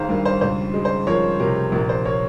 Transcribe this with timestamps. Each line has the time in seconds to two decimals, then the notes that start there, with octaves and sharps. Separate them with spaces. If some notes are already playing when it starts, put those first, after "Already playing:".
Already playing: G#1 D#3 G#3 C5 F5 A#5
0.09 G2 A#4
0.25 C5
0.41 C#2 C5
0.74 G#3
0.85 C5
1.07 F3 A#4 C#5
1.40 C3 A#4
1.72 A#1 A#4
1.89 C5
2.05 A#4 C#5